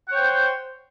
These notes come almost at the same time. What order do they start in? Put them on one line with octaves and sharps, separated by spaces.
F#5 C#5 G5 C5